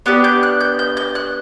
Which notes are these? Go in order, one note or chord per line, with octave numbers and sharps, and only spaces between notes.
B3 D4 G4 F#6
G6
F#6
G6
G6
G6
F#6